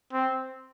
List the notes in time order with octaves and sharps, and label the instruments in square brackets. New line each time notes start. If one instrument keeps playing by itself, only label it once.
[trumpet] C4